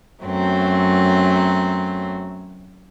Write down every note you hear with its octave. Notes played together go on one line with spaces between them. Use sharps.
F#2 F#3 A3 C4